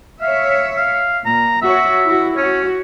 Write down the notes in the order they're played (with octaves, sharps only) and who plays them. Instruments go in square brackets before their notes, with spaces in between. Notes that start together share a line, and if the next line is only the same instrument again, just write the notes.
[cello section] C#5 E5 [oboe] F5
[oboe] F5
[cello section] A#2 [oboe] A#5
[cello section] F#4 C#5 [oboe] E5
[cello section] E4 F#4
[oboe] C#4 [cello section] F#4 C#5